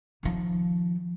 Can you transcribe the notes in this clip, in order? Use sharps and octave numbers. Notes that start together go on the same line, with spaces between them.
D#3 F3